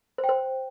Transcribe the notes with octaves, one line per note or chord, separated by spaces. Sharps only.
C5
G5
C5